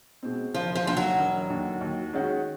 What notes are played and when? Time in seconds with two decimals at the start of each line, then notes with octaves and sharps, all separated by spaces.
0.23 B2 G#3 C4
0.54 E1 F3
0.75 F3
0.86 D#2 D3 F3
0.97 F#3
1.18 E1
1.50 D#2 D3
1.81 D#2
2.13 D#3 G#3 C#4 F#4